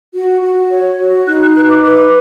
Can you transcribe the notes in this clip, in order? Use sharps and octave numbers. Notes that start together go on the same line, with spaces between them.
F#4
F#4
C#5
F#4
D#4 F#6
F#6
B4 F#6
D6
B4 D6